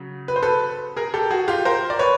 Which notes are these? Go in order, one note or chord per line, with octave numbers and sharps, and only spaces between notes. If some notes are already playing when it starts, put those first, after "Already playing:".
Already playing: C#3 F#3
B4
C5
A4 B4
G#4 A#4
G4 A4
F#4 G#4
F4 G4
A#4 C5
D5
B4 C#5